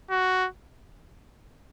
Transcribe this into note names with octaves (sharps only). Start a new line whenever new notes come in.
F#4